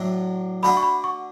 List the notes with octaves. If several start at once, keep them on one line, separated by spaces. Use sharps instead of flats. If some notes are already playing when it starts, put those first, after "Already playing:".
Already playing: A2 F#3 A3 D4
D3 A3 D4 F#4 B5
C#6
B5
C#6